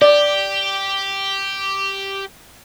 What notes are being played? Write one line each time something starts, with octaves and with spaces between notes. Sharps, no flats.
G4 D5